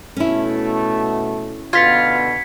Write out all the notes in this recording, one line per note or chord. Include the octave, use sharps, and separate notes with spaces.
B2 A3 C#4 E4
B2 D3 B3 F4 G#6 B6 C#7